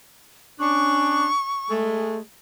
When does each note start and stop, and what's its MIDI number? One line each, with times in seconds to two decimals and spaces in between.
0.60 1.26 61
0.60 1.26 62
0.60 1.76 85
1.70 2.19 56
1.70 2.19 57